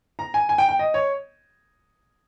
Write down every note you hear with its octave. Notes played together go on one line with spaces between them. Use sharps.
A#5
G#5
G#5
G5
G5
D#5
C#5